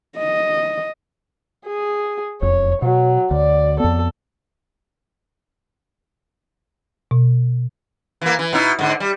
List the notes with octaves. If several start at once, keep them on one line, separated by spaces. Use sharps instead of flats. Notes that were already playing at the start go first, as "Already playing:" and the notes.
D#5
G#4
E1 F2 C#5
B2 F#3
D2 D5
F2 B3 A4
B2
E3 A#3
E3
B2 D#4 E4
G#2 D3
G3